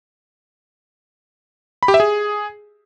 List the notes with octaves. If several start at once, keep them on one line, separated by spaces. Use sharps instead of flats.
B5
G4
E5
G#4